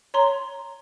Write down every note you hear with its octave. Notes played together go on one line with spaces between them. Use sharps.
C#5 A#5 C6